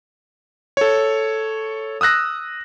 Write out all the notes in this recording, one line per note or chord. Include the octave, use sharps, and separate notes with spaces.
A4 C#5
D#6 E6 F#6 A#6